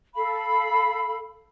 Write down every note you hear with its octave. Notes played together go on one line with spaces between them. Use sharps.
A4 F5 B5